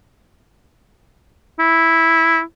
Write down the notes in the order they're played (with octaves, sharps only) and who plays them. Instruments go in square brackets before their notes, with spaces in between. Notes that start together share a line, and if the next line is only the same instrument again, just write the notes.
[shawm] E4